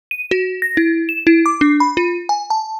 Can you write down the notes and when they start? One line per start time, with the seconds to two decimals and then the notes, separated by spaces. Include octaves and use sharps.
0.11 D#7
0.31 F#4
0.62 A#6
0.77 E4
1.09 E7
1.27 E4
1.46 D6
1.61 D4
1.80 B5
1.97 F4
2.29 G#5
2.50 A5